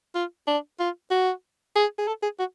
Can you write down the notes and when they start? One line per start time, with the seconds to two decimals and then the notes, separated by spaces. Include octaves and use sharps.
0.15 F4
0.47 D4
0.80 F4
1.11 F#4
1.76 G#4
1.98 G#4
2.07 A4
2.23 G#4
2.39 F#4